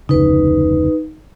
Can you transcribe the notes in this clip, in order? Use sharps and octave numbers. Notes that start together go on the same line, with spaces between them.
F1 D2 C#3 D#4 B4